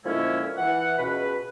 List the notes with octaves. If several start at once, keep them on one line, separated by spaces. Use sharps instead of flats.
A#2 D3 F3 G#3 C#4 E4
E3 F#5
C#2 B2 B4